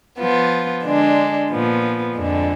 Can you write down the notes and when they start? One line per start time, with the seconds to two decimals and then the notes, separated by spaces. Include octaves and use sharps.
0.17 F3 B3 F4
0.83 D3 G#3 D4
1.50 A#2 F3 B3
2.16 F2 D3 G#3 D4